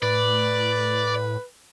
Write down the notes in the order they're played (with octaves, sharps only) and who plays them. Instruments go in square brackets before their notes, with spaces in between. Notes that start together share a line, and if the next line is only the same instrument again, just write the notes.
[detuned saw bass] A2 [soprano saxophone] B4 [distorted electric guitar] D5